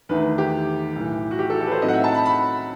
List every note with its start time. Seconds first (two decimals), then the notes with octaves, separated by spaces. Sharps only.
0.09 E2 D#3 A3 E4 B4
0.38 G4
0.96 B1 A2 E3
1.31 F#4
1.39 G4
1.50 A4
1.61 A4
1.66 B4
1.71 C5
1.82 A2 F#3 C4 D#4 D#5
1.88 F#5
1.93 E5
2.04 A5
2.14 B5
2.26 B5